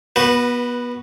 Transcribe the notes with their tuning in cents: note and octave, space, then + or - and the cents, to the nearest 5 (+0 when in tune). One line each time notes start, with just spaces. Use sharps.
B3 -25 F#4 +5 B4 +0